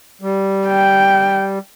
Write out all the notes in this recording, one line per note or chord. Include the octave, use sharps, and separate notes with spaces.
G3
G5